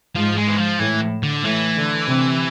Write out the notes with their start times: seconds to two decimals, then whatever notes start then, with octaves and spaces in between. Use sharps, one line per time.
0.15 G#2 F3
0.37 G#3
0.48 E3
0.58 F3
0.80 A2 E3
1.23 D3
1.44 A2 E3
1.76 D3
2.08 C3